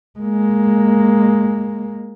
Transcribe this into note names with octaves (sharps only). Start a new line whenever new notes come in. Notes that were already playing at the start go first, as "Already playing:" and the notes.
G#3 A#3